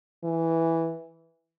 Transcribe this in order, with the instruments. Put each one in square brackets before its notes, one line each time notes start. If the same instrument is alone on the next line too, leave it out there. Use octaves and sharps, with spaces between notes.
[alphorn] E3